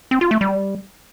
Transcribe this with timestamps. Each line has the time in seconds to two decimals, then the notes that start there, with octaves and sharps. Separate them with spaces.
0.11 C4
0.21 F4
0.31 A3
0.41 G3